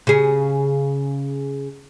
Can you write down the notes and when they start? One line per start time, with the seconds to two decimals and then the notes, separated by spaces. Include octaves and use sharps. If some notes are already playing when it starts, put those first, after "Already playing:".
0.07 C#3 G#4